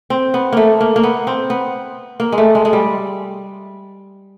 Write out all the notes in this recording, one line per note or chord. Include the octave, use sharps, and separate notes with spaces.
C4
B3
A3 A#3
A#3
A#3
B3
C4
B3
A#3
G#3
A3
G#3
G#3
G3